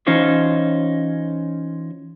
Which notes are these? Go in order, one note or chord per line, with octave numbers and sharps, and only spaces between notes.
E3 C#4 D#4 F4 C5 C#5